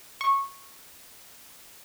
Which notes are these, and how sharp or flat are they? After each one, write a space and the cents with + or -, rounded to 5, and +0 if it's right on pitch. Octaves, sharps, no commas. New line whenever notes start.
C#6 -10